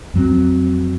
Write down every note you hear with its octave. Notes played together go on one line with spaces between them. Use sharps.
F2 F#3 C4